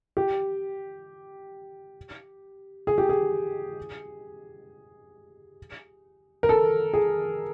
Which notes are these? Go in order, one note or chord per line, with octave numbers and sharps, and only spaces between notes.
G4
G#4
G4
G#4
A#4
A4
G#4